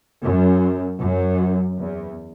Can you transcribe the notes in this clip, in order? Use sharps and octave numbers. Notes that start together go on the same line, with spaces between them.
F#2
F#2
E2